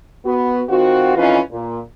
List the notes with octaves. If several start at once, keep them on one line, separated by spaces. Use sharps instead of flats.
B3 F#4
D#3 C4 F4 F#4
F2 E3 C#4 D#4 F4 B4
A#2